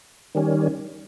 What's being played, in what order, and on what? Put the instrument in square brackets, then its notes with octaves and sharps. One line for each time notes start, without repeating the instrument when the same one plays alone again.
[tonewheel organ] D#3 G3 C#4